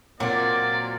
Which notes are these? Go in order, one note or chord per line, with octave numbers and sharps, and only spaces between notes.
A#2 F#3 A#3 C4 D5